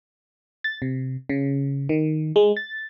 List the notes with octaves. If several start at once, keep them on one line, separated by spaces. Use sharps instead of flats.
A6
C3
C#3
D#3
G#3
A6